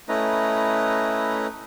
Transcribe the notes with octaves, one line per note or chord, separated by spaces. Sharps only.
A3 C#4 E4 B4 D#5 A#5